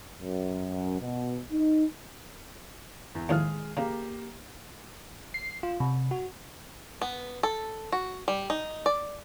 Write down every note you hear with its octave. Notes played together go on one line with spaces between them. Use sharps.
F#2
B2
D#4
E2
D#2 A2 F3 G#3 G#4 F6
C#3 A#3 G4 A#5
C7
F4
C3
F#4
B3
A4
F#4
G3
D#4
D5